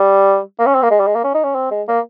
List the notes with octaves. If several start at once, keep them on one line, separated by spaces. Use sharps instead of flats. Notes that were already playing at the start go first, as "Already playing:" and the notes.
Already playing: G3
A#3
C#4
C4
A#3
G#3
G3
G#3
A#3
C#4
D#4
C#4
C4
G#3
A#3